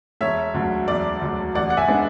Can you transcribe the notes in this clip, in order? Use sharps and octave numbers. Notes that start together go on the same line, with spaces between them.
E1 C#5 E5
D2 D3 F#3
E1 D5
D2 D3 F#3
A1 D5 F#5
F#5
E5 G#5
G#3 B3 D4